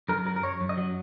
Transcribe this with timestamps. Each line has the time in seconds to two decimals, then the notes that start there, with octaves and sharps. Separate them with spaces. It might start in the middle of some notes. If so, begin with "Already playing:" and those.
0.09 F#2 A#4
0.26 F#3 A#4
0.36 A#4
0.43 F#2 C#5
0.61 F#2
0.69 D#5
0.77 F#3